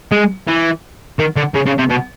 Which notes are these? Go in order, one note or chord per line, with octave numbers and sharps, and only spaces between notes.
G#3
E3
D#3
D3
C#3
C#3
C3
B2